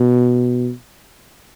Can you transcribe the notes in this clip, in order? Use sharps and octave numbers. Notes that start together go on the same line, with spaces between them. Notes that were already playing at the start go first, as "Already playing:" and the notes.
Already playing: B2